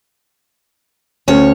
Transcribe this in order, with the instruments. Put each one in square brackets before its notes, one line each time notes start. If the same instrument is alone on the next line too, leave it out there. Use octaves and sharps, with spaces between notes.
[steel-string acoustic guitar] D2 C#5 [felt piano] C#4